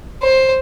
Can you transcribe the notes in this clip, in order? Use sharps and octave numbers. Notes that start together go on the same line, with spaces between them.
C5